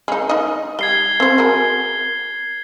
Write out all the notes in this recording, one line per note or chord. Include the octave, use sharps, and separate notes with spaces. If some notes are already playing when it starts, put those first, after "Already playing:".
G#3 D#4
D#4 D#5
G3 G#6 C7 G7
C4 C5
F#4 G#4 A#4